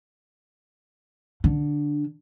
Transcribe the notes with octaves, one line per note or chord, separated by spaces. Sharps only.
D3